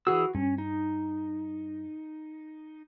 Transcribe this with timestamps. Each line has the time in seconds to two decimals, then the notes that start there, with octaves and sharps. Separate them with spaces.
0.07 E3 F#4 G#4 E6
0.35 G2 C#4
0.58 D#4